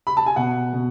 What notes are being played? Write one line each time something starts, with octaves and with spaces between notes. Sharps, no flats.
B5
A5
G#5
B2 F#5
B2